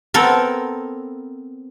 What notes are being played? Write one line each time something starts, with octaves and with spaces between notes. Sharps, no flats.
B3 C4 A4 A#4